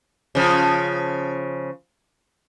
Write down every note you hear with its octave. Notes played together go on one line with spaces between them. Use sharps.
C#3 F3